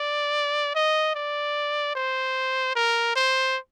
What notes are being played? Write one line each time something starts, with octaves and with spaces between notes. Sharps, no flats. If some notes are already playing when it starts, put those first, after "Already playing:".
Already playing: D5
D#5
D5
C5
A#4
C5